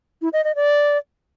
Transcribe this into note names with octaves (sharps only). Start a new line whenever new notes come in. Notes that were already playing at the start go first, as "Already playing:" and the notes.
E4
D#5
D#5
D5